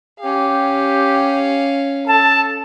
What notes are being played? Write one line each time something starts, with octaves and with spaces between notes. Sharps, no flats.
C#4 G4 F5
A4 A5